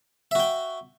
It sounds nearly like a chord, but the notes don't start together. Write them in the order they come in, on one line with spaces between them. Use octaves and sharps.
E5 F#4 G5